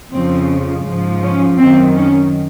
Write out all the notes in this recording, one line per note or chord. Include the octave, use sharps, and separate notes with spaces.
F2 C#3 F3 C4
G#2 F3
C#4
F#2 D#3 C4
C#4